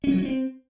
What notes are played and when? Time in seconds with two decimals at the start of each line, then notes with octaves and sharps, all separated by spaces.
0.04 C#4
0.11 F#3
0.18 C#4
0.25 C4